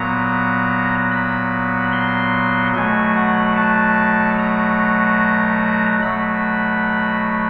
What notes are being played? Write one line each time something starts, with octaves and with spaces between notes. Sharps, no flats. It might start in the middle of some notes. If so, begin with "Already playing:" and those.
Already playing: A#2 F#3 B3 A#5
B5
C6
B2 F#3 A3 G#5
F#5
A5
A#5
B2 F#3 A3 B5